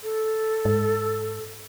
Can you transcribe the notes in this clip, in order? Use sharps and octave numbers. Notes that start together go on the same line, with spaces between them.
A4
G#2